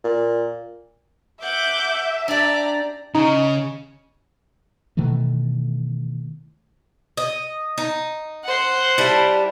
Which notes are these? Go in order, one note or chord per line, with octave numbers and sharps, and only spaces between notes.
A#2
E5 F#5 D6 G6
D4 G4 D5 A#5
C#3 D#4
B2 D#3 E3 A3
D#5
D#4
C5 F#5
G3 D4 E4